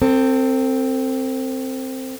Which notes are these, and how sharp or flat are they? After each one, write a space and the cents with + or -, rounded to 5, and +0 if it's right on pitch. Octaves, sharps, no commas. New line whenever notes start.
C4 +0 A4 +40